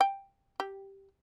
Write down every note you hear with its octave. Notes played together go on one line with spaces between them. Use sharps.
G5
G4